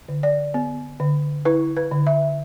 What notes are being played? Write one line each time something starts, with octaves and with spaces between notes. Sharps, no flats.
D3
D5
B3
D3
E4 B4
B4
D3
E5